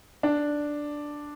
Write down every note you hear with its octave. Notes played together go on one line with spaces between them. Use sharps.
D4